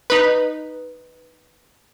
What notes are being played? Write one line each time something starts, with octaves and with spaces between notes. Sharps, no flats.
D#4 B4